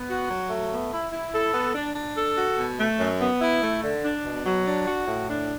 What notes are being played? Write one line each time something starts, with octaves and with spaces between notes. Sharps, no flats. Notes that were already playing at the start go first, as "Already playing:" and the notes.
Already playing: B3
F#4
F#3
A3
B3
E4
E4
A4
B3
D4
D4
A4
F#4
B2
A3
F#2
B3
E4
A3
D3
D4
B2
F#3
D4
F#4
A2
D4